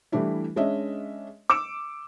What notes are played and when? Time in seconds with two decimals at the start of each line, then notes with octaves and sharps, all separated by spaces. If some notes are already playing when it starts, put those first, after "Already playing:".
0.12 E3 G3 A3 D4 E4
0.56 G#3 C#4 D4 D#5 E5
1.50 D6 E6 C#7 E7